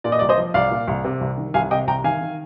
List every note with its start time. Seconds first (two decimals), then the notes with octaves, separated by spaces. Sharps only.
0.04 A#2 D5
0.12 D#5
0.19 C2 D5
0.29 C5 D#5
0.38 F3
0.54 C2 D5 F5
0.71 A#2
0.88 C2
1.04 C3
1.21 C2
1.38 D#3
1.54 C2 F5 G#5
1.71 C3 D#5 G5
1.87 C2 G5 A#5
2.04 D#3 F5 G#5
2.21 D#3